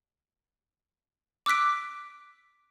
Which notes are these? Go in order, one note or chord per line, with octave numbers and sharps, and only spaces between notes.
D6 E6 F#6 B6 D7